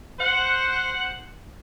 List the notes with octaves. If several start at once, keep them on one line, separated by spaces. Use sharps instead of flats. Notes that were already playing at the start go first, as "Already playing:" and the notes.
C5 F#5